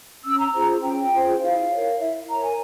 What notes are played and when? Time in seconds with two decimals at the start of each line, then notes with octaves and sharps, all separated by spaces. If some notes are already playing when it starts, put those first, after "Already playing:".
0.24 C#4 E6
0.39 A#5
0.53 F4 G#4 C5 A#5
0.82 C#4 G5
1.12 F4 G#4 C5
1.41 E4 F5
1.70 A#4 C#5
1.99 E4 E5
2.28 A#4 C#5 A#5
2.43 G#5